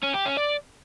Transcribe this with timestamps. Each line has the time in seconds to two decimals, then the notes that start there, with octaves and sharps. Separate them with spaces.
0.03 C#4
0.15 G4
0.26 C#4
0.37 D5